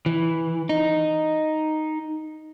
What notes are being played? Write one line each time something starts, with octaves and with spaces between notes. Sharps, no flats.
E3
D#4